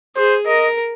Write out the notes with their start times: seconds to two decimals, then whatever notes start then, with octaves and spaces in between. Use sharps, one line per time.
0.16 G#4 C5
0.46 A#4 D#5